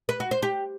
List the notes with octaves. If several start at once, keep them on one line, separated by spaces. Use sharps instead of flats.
B4
F#4
C5
G4